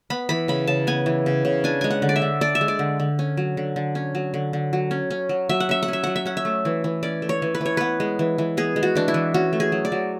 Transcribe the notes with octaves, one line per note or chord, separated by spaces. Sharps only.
B3 B5
E3 B5
C#3 B5
C#3 A5
B3 G#5
E3
C#3
C#3
D4 G#5
G#3 G#5
F#5
D3
D5
E5
D3
D4 D5
E5
G#3
D5
D3
D3
C#4
F#3
D3
D3
C#4
F#3
D3
D3
F#3
C#4
C#4
F#3
F#3 E5
F#5
C#4 E5
F#5
C#4 E5
F#3 F#5
E5
C#4 F#5
E5
A3
E3
E3
C#4 D5
A3
C#5
E3
B4
E3 C#5
B3 B4
G#3
E3
E3
B3 G#4
G#3
F#4
E3 D4
E4
E3
C#4 F#4
A3
G#4
F#3
D5
F#3